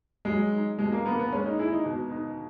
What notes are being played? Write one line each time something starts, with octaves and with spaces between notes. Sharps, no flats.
F#3 G#3
D#4
B2 G#3
A#3
A#3 B3
B3
G#3 C#4
D#4
E4 G#4
D#4
B2
D#4